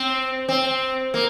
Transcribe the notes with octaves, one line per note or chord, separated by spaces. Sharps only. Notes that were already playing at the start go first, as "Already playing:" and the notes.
Already playing: C4
C4
A#3